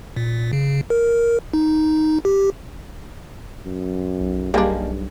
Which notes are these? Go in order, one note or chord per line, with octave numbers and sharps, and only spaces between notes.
A#2
C#3
A#4
D#4
G4
F#2
B1
G2 G3 G#3 A#3 D4